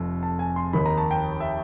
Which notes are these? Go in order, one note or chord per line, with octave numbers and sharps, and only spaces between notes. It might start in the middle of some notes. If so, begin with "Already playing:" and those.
Already playing: F1 F2 C3
A5
G#5
C6
D#2 D#3 B5
A#5
A5
G5
E5